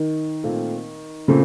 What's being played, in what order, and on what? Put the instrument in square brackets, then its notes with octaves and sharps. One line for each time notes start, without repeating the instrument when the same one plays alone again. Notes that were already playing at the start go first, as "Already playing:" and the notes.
Already playing: [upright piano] D#3
[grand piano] A#2 A3 C4
[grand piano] A#2 A3 C4 [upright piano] C#3